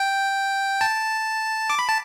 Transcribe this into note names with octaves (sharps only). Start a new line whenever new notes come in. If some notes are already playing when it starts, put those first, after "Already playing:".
Already playing: G5
A5
D6
B5
A5